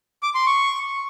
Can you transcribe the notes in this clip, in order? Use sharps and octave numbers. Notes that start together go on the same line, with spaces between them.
D6
C6
C#6